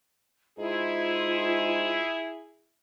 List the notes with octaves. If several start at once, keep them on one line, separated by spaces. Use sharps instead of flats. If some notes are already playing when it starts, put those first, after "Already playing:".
G#2 E4 F4 G#4